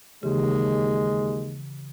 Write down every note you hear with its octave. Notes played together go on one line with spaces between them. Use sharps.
D#2 C#3 E3 G#3 G4